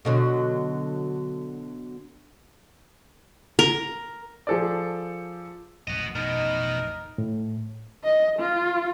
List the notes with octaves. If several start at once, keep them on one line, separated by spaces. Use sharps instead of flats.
B2 D3 F#3
A#4
F3 G#4 A4 C5 D5
A1 F2 F#3 F#4 D#5
B2 D#4 A#4 D#5
A2
D#5
F4